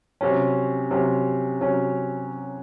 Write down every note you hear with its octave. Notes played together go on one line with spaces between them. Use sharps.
C3 F#3 C#4
C3 F#3 C#4
C3 F#3 C#4